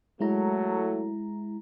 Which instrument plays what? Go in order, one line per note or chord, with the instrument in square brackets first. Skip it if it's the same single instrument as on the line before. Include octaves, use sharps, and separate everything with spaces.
[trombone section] F#3 A3 [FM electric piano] G#3 E4 A#5